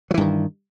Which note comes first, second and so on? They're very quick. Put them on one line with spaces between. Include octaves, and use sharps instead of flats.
F#3 E3 G2 D#3